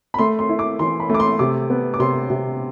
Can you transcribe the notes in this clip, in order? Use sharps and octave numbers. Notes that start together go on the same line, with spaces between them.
B5
A3 C6
C6
E4
D6
E3 C6
B5
A3 D6
C6
C3 D6
B3
D6
C3 C6
C3